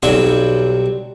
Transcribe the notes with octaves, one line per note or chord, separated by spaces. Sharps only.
B1 F#3 G3 C4 G#5